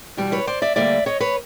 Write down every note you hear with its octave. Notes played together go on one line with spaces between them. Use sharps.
E2 B2 G3
B4 C#5
C5 D5
D5 E5
D2 D3 G3 A#3 D5 E5
C#5 D#5
B4 C#5